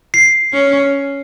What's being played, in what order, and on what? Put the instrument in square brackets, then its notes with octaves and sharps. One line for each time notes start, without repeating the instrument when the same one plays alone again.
[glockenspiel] C7
[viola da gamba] C#4